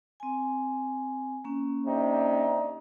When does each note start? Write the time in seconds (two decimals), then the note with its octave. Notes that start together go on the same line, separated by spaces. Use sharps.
0.20 C4 G#5
1.45 A#3 C#4
1.86 C3 D4 D#4